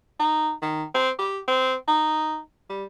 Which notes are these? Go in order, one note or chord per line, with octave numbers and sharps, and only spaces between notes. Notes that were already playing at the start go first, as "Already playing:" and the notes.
D#4
D#3
C4
G4
C4
D#4
G3